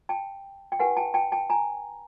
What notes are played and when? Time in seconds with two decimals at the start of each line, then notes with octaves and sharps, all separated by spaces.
0.09 G5 A5
0.72 G5
0.79 E4 G4 B4 F#5 G#5
0.97 G5 A5
1.14 G5 A5
1.32 G5 A5
1.50 G#5 A#5